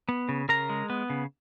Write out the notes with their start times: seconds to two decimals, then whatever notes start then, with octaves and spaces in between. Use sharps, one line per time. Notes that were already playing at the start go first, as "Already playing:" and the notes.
0.09 B3
0.29 C#3
0.49 C#3 A#4 A#5
0.69 G#3
0.90 B3
1.10 C#3